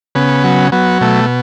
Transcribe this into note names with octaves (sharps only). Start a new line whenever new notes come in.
C#3 B3
F#3
F#3 B3
B2 A3